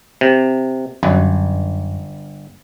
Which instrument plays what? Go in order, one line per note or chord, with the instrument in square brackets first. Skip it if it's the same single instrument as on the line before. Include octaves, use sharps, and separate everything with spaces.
[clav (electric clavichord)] C3
[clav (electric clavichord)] G1 [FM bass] F#2